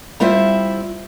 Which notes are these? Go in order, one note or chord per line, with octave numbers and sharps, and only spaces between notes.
G3 C4 E4 F4 C5 E5